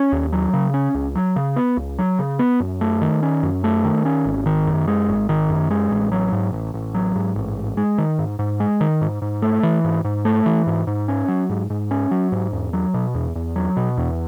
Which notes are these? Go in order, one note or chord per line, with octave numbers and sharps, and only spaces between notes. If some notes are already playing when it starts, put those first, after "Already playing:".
Already playing: C#4
D#2
F#3
C#3
C#4
C#2
F#3
C#3
B3
C#2
F#3
C#3
B3
F#2
A3
D#3
C#4
F#2
A3
D#3
C#4
G#1
D#3
F#2
G#3
G#1
D#3
F#2
G#3
A1
F#3
G#2
A1
A1
F#3
G#2
A1
G#2
G#3
D#3
G#2
G#2
G#3
D#3
G#2
G#2
A3
E3
G#2
G#2
A3
E3
G#2
G#2
C#4
F#3
G#2
G#2
C#4
F#3
G#2
E2
F#3
B2
E2
E2
F#3
B2
E2